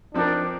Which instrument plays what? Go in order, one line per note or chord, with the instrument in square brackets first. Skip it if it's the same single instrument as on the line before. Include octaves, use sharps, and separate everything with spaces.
[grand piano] F3 C4 D#4 A#4 [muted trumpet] D4